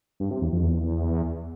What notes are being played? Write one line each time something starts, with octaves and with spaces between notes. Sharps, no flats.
G2
C3
E2
F2
E2